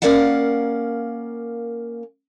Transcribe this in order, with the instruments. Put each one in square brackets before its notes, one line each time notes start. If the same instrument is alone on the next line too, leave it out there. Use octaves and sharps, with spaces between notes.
[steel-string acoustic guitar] A#3 C#4 A#4 D5 F5 F#5